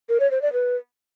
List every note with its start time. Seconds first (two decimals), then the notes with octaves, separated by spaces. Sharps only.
0.09 A#4
0.20 C#5
0.31 C5
0.42 D5
0.53 B4